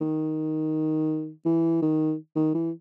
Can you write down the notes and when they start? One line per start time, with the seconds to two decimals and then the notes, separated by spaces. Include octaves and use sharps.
0.01 D#3
1.45 E3
1.82 D#3
2.36 D#3
2.55 E3